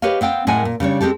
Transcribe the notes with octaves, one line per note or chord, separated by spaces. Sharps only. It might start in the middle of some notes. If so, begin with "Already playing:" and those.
G4 B4 C#5 D#5 F5
B3 C4 F5 G5
A2 G#3 A#4 F#5 G#5
A#2
C#3 G3 D4 C#5
G#3 C4 G4 A4